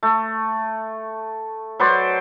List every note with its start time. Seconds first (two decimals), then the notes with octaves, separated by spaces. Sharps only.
0.03 A3
1.79 F#3 B4 C5 D5